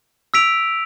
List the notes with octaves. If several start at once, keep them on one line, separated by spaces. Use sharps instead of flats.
E6 B6 D7 F7